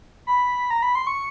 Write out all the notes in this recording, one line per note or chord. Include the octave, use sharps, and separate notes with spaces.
B5
A#5
B5
C6
C#6